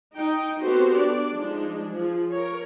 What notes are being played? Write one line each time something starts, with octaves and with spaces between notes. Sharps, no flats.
D#4 G5
B3 C4 F#4 G4 A4 C5
D4 D5
F3 G#3 D4 D#4
F3 G#4
A#4 C#5